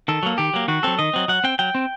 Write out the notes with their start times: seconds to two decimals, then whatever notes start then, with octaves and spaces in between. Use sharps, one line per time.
0.08 D#3 A4
0.23 F#3 A#3
0.38 D#3 G4
0.54 F#3 A#3
0.68 D#3 F#4
0.83 F#3 C4 A4
0.99 D#3 D#5
1.14 F#3 C4
1.28 F#3 F#5
1.44 C4 G5
1.59 F#3 G5
1.75 C4